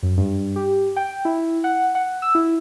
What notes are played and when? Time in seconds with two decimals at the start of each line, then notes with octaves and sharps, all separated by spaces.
0.03 F#2
0.17 G2
0.56 G4
0.96 G5
1.25 E4
1.64 F#5
1.95 F#5
2.22 E6
2.35 E4